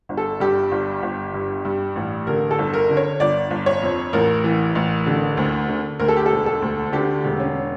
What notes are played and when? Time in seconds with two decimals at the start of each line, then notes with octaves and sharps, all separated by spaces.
0.09 G1
0.17 A4
0.40 G2 G4
0.72 G1
1.03 G1
1.34 G2
1.65 G2
1.96 A1
2.27 D3 A#4
2.51 A4
2.58 G1
2.74 A#4
2.89 D3
2.97 C#5
3.20 G1 D5
3.51 G1
3.66 C#5
3.82 F2
4.13 A1 A#4
4.44 E3
4.75 A1
5.06 D3
5.37 D2
5.68 D3
6.00 D2 A#4
6.08 A4
6.17 G4
6.26 E1 A4
6.46 A4
6.62 D2
6.93 D3 G4
7.24 E1
7.40 C#4